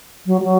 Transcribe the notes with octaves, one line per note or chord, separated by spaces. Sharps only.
F#3
G3
F#3